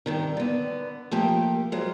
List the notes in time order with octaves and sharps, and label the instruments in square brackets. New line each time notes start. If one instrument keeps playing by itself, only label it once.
[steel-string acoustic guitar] G2 C3 D#3
D3 B3
F3 A3 A#3 G4
F#3 G#3 F4 C5